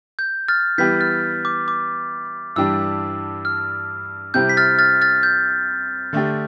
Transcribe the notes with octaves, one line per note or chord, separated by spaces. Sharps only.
G6
F6 A6
E3 G3 B3 E4 G4 G6 B6
F6 A6
D6
D6
G2 E3 G3 D4 G4 E6
F6
C3 G3 C4 E4 G4 G6
B6
F6 A6
F6 A6
F6 A6
G6
D3 A3 D4 G4